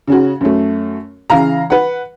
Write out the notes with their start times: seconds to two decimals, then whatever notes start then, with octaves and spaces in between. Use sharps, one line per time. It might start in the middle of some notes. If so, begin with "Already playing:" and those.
0.08 C#3 C#4 F#4
0.41 F#2 F#3 A3
1.30 C#3 E3 F5 A#5
1.70 B4 F#5